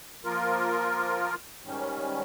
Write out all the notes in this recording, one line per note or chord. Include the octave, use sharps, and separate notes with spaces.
F3 A#3 F4 A#4
G#2 D#3 G3 C#4